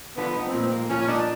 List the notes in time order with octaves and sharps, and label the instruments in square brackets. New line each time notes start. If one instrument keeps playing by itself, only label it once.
[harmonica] D3 B3 [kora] F3
[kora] D#4
[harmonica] C4
[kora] A#2
A#3
[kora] F3 [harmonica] C#4
[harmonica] C#4
[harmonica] D4 [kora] D#4